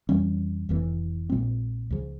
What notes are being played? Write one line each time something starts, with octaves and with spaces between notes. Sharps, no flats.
F2 E3 G3 C#4
F1 F2 E3
A#1 A#2 G#3 C4
C#2 C#3 F3